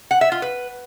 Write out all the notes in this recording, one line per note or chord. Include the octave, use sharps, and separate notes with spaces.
F#5
E5
F4
B4